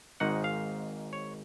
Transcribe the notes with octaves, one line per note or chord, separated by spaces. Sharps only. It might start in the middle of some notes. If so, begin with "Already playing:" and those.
G#1 G#2 D#3 G#3 D#4 F#5
F5
C#5